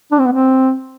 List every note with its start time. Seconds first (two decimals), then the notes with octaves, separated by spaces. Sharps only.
0.12 D4
0.19 C4
0.26 B3
0.32 C4